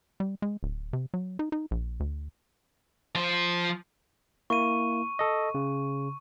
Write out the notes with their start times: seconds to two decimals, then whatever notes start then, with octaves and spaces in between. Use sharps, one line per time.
0.20 G3
0.42 G#3
0.63 D1
0.93 C3
1.14 F#3
1.39 D#4
1.52 D#4
1.71 A#1
2.00 D2
3.15 F3 C5
4.50 A#3 E4 C#6 D#7
5.19 A4 D#5
5.55 C#3